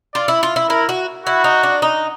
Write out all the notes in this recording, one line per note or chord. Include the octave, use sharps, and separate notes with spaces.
F4 D5
E4
F4
E4
E4 A#4
F#4
E4 F#4
D#4
D4
D#4